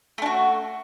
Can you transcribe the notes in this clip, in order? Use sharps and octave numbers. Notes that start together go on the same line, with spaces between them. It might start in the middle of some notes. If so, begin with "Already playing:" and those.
A3 D4 F#4